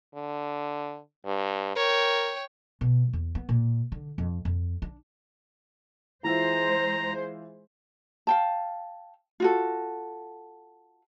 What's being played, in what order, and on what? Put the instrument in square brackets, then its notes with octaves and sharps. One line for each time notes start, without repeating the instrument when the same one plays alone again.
[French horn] D3
G2
[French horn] A#4 [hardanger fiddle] C#5 G5
[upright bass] B2
E2
B3
A#2
D3
F2
F2
D4
[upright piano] E3 F4 E5 [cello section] G#3 C5 [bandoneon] A#5
[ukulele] F5 G5 A5
F4 F#4 A4